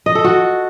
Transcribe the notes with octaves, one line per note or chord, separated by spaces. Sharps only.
D#5
A4
F#4